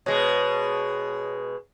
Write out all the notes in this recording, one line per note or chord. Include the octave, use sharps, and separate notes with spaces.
B2 G#3 C#5